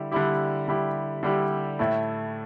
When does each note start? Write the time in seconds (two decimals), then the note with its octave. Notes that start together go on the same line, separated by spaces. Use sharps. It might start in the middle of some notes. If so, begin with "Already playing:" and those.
Already playing: D3 G3 E4 G4
0.12 D3 G3 E4 G4
0.68 D3 G3 E4 G4
1.23 D3 G3 E4 G4
1.79 A2 A3 E4